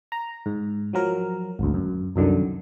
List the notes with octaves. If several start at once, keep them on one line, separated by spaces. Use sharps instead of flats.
A#5
G#2
F3 F#3 A#4
G#1 D2
F#2
C2 F#2 D3 D#3